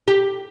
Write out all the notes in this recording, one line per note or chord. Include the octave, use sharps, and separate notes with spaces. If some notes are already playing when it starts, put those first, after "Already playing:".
G4